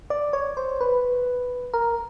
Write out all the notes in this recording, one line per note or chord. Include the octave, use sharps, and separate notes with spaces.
D5
C#5
C5
B4
A#4